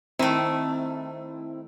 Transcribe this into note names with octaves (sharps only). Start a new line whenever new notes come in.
D#3 A3 C4 E4